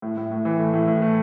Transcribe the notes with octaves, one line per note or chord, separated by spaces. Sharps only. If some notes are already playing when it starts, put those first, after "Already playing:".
A2
A2
A2
E3
A3
A2
A2
A3